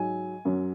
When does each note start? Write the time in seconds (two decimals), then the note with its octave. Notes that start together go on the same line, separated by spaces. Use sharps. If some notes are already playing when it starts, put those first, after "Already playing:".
Already playing: G#2 F#3 G#5
0.45 F#2 F#3